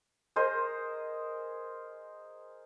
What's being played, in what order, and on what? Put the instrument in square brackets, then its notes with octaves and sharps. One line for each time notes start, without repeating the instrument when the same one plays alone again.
[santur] G#4 A#4 C5 D#5